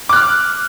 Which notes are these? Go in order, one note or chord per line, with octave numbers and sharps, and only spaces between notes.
D6 F6 F#6